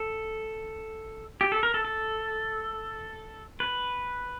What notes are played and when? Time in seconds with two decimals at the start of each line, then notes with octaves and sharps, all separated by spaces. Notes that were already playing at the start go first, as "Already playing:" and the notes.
Already playing: A4
1.41 G4
1.52 A4
1.63 A#4
1.74 A4
1.85 A4
3.60 B4